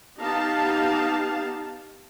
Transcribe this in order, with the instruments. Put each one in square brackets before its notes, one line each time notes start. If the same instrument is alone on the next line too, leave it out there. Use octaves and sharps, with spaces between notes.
[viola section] B3 D#4 G4 F5 A5